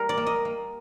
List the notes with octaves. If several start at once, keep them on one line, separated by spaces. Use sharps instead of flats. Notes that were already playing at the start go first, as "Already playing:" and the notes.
Already playing: G3 A#4
D5
A#3
D#5
A#3